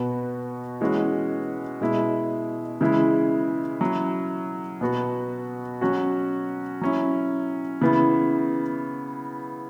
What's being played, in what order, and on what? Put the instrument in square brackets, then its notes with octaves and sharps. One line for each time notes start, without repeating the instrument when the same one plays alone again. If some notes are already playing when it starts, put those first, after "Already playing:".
Already playing: [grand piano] B2 B3 F#4
E3 G#3 C#4 F#4
B2 G#3 E4
C#3 E3 G#3 E4
F#3 C#4 E4
B2 B3 F#4
F#3 C#4 F#4
F#3 C#4 E4
C#3 E3 B3 E4